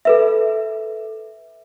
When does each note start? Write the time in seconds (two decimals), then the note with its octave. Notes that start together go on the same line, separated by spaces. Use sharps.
0.05 A4 B4 E5